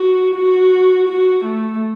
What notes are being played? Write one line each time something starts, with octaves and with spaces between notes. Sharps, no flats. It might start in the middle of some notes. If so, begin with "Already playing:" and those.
Already playing: F#4
F#4
F#4
A3